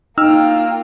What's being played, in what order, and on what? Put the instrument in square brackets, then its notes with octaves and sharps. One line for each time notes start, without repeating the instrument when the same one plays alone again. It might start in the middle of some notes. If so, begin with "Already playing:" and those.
[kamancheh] A#3 F4 [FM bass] D#4 [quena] G5 [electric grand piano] E6 F6